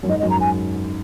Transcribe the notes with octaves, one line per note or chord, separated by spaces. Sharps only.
F#2
G#2 D#5
F#2 D#5
A#5
G#5